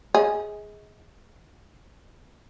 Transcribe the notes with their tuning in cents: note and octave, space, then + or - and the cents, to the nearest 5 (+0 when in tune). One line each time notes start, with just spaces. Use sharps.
G#4 +0 D#5 +35